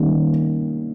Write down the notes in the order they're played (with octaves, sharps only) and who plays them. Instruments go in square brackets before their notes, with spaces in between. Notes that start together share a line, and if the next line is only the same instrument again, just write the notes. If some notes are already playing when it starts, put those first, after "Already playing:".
Already playing: [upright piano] D#3 G3 A#3 C#4